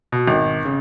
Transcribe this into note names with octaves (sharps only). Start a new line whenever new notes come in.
B2
G#1
C#3